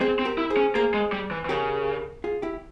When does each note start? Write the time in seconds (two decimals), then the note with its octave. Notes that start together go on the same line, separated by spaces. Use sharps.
0.01 C4 G#4 C5
0.19 C4
0.25 G4 A#4
0.38 E4
0.50 G#4 C5
0.57 C#4
0.75 A#3 G#4 C5
0.94 G#3
1.12 G3
1.31 E3
1.45 E3
1.49 C#3 G4 A#4
2.24 F4 G#4
2.42 E4 G4